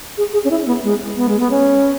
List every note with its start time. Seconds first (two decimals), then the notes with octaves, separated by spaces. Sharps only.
0.18 G#4
0.33 G#4
0.44 C#4
0.51 E4
0.66 B3
0.84 G#3
1.17 B3
1.29 G#3
1.40 B3
1.51 C#4